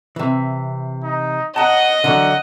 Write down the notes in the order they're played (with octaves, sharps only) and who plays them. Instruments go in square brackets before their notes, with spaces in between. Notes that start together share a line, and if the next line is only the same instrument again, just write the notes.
[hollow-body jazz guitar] C3 E3
[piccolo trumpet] D#4
[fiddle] D#5 [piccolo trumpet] F#5 [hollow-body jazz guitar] A5 A#5
[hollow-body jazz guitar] D3 E3 F#3 [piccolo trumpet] F#5